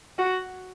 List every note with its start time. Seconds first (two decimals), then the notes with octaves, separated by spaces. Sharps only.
0.18 F#4